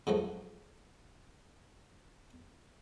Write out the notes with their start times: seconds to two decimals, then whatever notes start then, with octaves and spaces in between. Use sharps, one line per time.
0.07 C#3 F3 F#3 A3